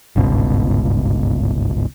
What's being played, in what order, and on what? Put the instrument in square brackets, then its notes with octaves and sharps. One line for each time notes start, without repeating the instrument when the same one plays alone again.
[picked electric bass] G1 C#2 G#2 B2